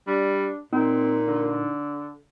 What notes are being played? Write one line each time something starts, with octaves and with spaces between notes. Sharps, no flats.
G3 D4
A#2 C4 D#4
D3